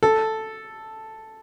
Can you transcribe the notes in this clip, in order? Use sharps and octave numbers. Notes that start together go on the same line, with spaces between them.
A4